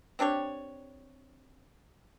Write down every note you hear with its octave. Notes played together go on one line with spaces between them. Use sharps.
C4 D4 G4 C#5